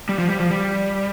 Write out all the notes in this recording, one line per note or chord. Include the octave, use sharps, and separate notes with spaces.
G3
F3
G3
F3
G3